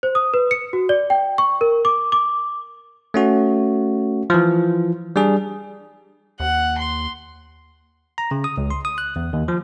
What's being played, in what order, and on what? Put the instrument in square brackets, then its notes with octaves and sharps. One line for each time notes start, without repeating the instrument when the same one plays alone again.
[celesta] C5
D#6
B4
C#7
F#4
D5
G5
C#6
A#4
D6
D6
[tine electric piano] A3 C#4 F#4
E3 F3
G3 D4 G#4
[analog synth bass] D#2 [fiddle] F#5
[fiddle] C6
[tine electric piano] A#5
C#3
D#6
C#2
C6
D#6
F#6
E2
D#2
F3